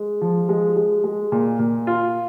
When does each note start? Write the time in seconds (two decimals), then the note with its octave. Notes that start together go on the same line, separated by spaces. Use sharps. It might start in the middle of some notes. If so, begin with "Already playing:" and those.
Already playing: G#3
0.21 F3
0.49 G#3
0.76 G#3
1.04 G#3
1.32 A#2
1.59 A#2
1.87 F4